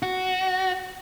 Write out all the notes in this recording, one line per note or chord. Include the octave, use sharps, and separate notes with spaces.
F#4